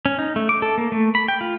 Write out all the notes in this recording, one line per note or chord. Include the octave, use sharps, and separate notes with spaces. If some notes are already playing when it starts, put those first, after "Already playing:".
C#4
D#4
A3
D6
A4
A#3
A3
B5
G5
F4